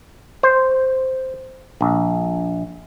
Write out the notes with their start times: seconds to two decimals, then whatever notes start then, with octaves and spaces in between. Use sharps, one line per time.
0.43 C5
1.81 A#1